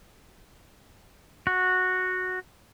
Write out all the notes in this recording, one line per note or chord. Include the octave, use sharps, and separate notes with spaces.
F#4